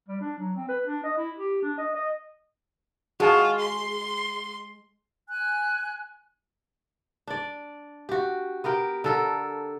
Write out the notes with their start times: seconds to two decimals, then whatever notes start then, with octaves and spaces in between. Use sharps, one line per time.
0.08 G3
0.20 D4
0.38 F#3
0.56 C4
0.68 B4
0.86 D4
1.03 D#5
1.17 E4
1.37 G4
1.62 D4
1.78 D#5
1.95 D#5
3.20 G#3 F4 F#4 G#4 A5
3.59 C6
5.29 G#5 F#6
7.27 D4 D5
8.09 F#4 G4
8.64 B3 G4 A#4 G5
9.04 D3 A4 A#4